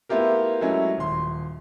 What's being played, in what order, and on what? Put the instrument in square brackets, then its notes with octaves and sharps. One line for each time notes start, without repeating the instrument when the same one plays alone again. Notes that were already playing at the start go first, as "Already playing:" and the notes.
[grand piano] A3 B3 E4 F4 G4 A#4
F#3 G#3 A3 C#4 E4 G#4
D#1 C6